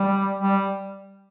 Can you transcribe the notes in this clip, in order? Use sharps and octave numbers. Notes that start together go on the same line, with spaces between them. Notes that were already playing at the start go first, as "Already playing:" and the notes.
Already playing: G3
G3